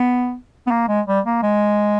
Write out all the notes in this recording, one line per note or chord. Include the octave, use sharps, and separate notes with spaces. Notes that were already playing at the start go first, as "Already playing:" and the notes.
Already playing: B3
B3
A#3
G#3
G3
A#3
G#3